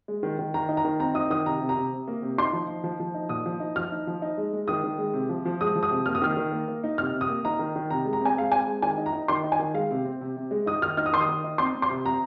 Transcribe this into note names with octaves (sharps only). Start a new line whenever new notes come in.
G#3
D#3
D#3
D#3 A#5
D#4
A#5
D#3
C4 A#5
D#4 D#6
D#3 D#6
C3 A#5
C3
A#5
C3
C3
A#3
C3
D#4 C6
F3
D#4
F3
F3
D#4
A#2 D#6
F3
D#4
F3 F6
D#4
F3
D#4
G#3
G#3
D#3 D#6
D#3
G#3
C3
F3
F3
G#3 D#6
F3
D#6
C3
A#3 F6
D#6
D#3 F6
D#3
A#3
A#3
D#4
C3 F6
C3
D#6
A#3
D#4 A#5
D#3
D#3
C3 A#5
G#3
A#5
C4 G#5
G#3 F5
C4 G#5
G#3
D#3 G#5
D#4
A#5
D#4
D#3 C6
D#4
G#5
D#3
G#3 F5
C3
C4
C3
C3
G#3
D#4 D#6
D#3 F6
D#4 F6
D#6
D#3 C6
D#6
D#3
D#4
C4 C6
C4
C6
C3
C4 A#5